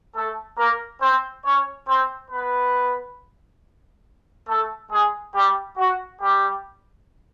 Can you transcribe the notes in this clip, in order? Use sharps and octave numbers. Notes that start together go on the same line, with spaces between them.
A3 A4
A#3 A#4
C4 C5
C#4 C#5
C4 C5
B3 B4
A3 A4
G#3 G#4
G3 G4
F#4
G3 G4